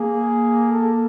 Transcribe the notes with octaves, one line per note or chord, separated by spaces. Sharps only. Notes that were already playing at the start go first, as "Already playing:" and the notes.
Already playing: A#3 G#4
A4